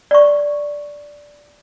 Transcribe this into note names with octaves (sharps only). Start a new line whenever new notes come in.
D5 C#6